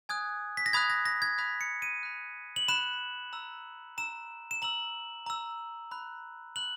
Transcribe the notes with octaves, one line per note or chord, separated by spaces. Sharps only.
G#5 D#6 F#6 G#6
B6
A#6
B5 D#6 F#6 G#6
A#6
A#6
G#6
B5 D#6 F#6 B6
C#7
D#7
B5 F#6
F#7
B5 F#6 E7
A#5 E6
A#5 E6 E7
E7
A#5 E6 F#7
A#5 E6
B5 F#6
B5 F#6 F#7